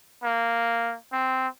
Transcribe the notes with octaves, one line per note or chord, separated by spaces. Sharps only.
A#3
C4